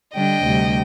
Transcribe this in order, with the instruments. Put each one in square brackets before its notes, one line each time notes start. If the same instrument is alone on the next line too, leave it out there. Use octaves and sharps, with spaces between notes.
[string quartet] D3 G3 D4 D#5 G5
D2 C3 G3